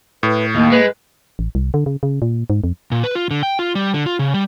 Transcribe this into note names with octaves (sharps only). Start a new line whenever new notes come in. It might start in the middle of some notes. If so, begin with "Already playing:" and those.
A2 B4
D#2 A#3
G#3 B4
A1
C2
D3
C#3
C#3
A#2
G#2
F2
A#2
B4
F4
D3
G5
F4
G3
D3
F4
C#3
G3